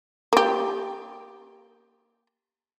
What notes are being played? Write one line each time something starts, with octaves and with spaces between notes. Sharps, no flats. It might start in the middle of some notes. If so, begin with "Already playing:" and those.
A#3 G4